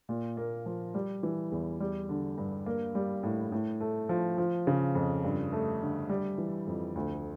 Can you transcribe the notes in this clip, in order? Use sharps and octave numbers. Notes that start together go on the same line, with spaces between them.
A#2
A#3
F3
G3
E3
E2
G3
D3
G2
A#3
G3
A2
A2
A3
F3
F3
C#3
F2
G2
A3
D3
G3
E3
F2
D2